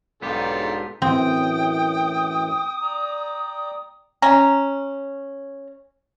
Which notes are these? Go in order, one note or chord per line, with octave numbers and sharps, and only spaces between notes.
B1 G#2 B3 D4 F4 G4 A4
F#2 A2 E3 C4 G5 D#6
D5 G5 A#5
C#4 A#5